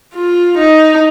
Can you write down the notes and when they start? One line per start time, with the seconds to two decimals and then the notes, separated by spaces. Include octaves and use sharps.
0.14 F4
0.58 D#4